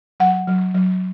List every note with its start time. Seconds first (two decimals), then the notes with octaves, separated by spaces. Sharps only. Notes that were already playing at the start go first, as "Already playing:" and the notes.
0.20 F#3 F#5
0.47 F#3
0.74 F#3